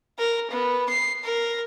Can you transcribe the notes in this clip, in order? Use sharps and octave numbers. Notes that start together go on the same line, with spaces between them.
A#4
B3
C7
A#4